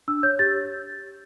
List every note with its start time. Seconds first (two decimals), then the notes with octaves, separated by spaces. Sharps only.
0.08 D4 E6
0.23 C#5 G6
0.39 G4 A6